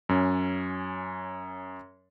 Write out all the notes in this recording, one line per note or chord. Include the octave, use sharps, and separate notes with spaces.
F#2 C#4